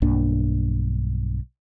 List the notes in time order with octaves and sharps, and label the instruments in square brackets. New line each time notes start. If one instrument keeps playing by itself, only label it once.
[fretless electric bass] B1 G2 A#3 D4